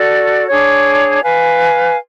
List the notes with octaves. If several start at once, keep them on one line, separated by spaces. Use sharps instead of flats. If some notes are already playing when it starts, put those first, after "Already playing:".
Already playing: F#4 A4 D5
D4 G#4 C#5
B4 F5 G#5